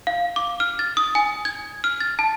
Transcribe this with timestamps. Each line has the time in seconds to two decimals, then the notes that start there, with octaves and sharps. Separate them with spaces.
0.07 F5
0.36 D6
0.60 F6
0.79 A6
0.97 D#6
1.15 G#5
1.45 G#6
1.84 F6
2.00 A6
2.19 A5